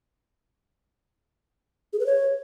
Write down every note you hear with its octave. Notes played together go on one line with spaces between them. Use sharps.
G#4
B4
C#5